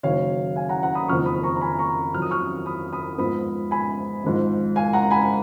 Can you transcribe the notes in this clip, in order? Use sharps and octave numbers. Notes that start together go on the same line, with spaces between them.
F#1 F#2 D#3 C#5 F5
F5 G#5
F#5 A#5
F#5 A#5
B5 D#6
F#1 F2 D#3 C#6 F6
B5 D#6
A#5 C#6
A#5
G#5 B5
A#5 C#6
F2 D#3 F#3 F6
D#6
C#6 F6
B5 D#6
B5 D#6
G#2 F3 B3 B5 D#6
G#5 B5
G#1 G#2 F3
F5 G#5
F#5 A#5
G#5 B5